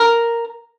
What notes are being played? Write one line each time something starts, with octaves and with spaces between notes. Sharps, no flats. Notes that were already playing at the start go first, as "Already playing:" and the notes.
Already playing: A#4